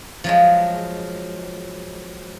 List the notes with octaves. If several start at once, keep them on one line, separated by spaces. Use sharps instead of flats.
F3 F#3 G#3